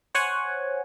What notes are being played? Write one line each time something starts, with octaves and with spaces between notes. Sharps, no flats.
C5 C#5 F#5 G#5